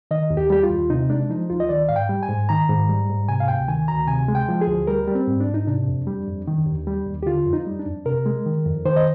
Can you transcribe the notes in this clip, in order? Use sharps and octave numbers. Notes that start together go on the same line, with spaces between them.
D#3 D#5
D#2
G4
G3 G4
F4
D#2
C3 D#4
G#3 D4
F3 D#4
D2 F4
D#5
D#3 D5
G#2 F5
G5
G3
G#5
G#2
D#3 A#5
G#2
G3
G#2
C3 G#5
F5
D2 G5
D#3 G#5
D2 A#5
C3 G#5
G#3
G5
F3
G#4
D2
G3 A#4
G3
C4
G#2
D4
G#2
D#4
C3 D4
F2
G3
F2
D#3
D#2
G3
D#2
G4
D3 F4
F2
D#4
G3
D4
F2
C3 A#4
G#3
D#3
F2
D#3 C5
D#5